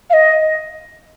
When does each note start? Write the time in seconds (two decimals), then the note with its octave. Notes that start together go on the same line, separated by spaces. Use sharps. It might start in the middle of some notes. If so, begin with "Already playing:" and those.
0.10 F5
0.13 D#5